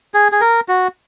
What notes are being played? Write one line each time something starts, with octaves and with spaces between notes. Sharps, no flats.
G#4
G#4
A#4
F#4